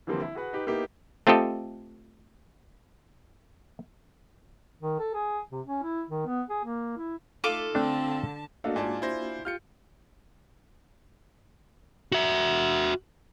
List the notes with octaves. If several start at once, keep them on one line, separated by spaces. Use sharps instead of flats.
D3 E3 F3 G3 A#3 C4
E4
F#4 G#4 B4 F#5
D#4 G4 B4
A#3 B3 D#4 E4 G4
A3 C4 F4 G4 A4 D#5
D#3
A4
G#4
C3
C#4
E4
D#3
B3
G#4
A#3
E4
A3 D#4 F4 A4 D6
D3 A3 C4 D4 A5
A3 A#3 D4 F#4 A4 D#5 F5
G#2 F4 D5 G#5 A5
E4 C5 A#6
F4 G4 F6 G6 C#7
F#4 E5